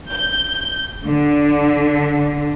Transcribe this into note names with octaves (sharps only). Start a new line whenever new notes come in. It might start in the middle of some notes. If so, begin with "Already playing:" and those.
G6
D3